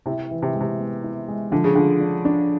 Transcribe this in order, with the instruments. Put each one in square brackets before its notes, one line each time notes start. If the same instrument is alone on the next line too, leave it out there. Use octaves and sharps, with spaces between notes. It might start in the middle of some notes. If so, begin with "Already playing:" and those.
[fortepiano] C3 [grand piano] E4
[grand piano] E3
[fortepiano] C3
[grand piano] G#3
[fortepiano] C3
[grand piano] B3
E4
G#3
[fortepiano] D3 [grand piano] F3
[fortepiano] C#3
[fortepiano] D3 [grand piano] F4
[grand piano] D4
D4